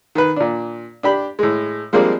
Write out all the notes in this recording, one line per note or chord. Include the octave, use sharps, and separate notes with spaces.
D#3 B4
A#2 D4
D4 G4 B5
A2 G#3
F3 G3 G#3 A#3 C4 D4